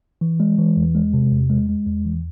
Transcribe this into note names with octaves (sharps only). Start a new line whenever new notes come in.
E3
G#3
E3
E2
G#3
C3
E2
G#3
G#3
E2
E3